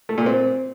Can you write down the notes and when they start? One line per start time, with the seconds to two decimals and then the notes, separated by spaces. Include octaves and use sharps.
0.09 A3
0.18 A#2
0.26 C4